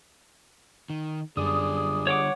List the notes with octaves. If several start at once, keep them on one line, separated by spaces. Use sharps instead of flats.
D#3
F#2 D3 G3 G#4 D5 D#6
C#5 F#5 D6